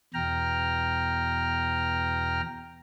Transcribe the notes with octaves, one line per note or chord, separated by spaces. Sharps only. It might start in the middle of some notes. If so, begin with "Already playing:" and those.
E2 B2 G5 A#5 F6